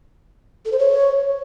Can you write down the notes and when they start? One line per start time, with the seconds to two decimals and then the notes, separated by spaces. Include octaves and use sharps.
0.65 A4
0.72 C5
0.79 C#5